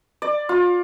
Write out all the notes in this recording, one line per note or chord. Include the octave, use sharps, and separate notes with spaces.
D5
F4